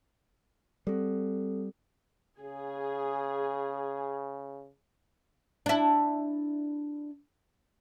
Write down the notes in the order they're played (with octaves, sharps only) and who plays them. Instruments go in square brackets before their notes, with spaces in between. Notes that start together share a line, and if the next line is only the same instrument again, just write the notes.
[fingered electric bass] G3 [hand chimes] C4 A4
[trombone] C#3 [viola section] G#4
[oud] D4 E4